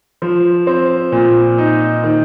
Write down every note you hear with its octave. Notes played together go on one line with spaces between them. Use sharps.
F3
C4
A#2
D#4
D#3